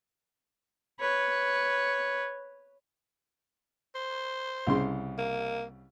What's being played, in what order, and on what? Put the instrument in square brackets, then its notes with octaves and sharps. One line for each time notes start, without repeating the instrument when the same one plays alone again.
[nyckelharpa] B4 C#5
[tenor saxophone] C5
[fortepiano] C2 C#3 C6
[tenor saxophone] A#3